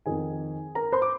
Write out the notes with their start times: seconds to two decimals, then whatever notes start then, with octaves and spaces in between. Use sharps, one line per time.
0.06 F2 D#3 G#4 G#5
0.75 A#4 A#5
0.92 C5 C6
1.02 D6